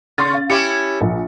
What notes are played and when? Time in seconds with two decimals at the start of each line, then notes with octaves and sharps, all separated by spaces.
0.18 C#3 C6 C#6 A6
0.33 F5
0.50 C#4 E4 G4 C#7
1.01 A#1